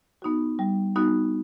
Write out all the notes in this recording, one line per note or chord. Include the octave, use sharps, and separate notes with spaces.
B3 D#4 F#4
G3
B3 D#4 F#4